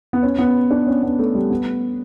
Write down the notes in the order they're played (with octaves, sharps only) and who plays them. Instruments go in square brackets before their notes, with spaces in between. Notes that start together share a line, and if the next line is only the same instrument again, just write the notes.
[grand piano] B3
C#4
B3
D4
C#4
B3
A3
G3
B3